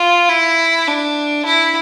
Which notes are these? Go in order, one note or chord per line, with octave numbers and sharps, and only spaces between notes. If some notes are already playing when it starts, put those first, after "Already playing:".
Already playing: F4
E4
D4
E4